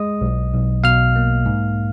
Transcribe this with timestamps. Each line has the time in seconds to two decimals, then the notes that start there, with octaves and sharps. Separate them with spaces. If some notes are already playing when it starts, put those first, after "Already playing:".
Already playing: G#3 D#5 D#6
0.21 B1
0.53 B1
0.84 B2 F5 F6
1.16 A#3
1.46 G#2